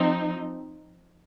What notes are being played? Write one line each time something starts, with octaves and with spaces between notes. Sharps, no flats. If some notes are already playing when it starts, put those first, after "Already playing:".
Already playing: F3 C4 D#4